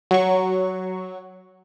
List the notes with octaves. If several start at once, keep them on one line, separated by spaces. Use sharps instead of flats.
F#3 C#6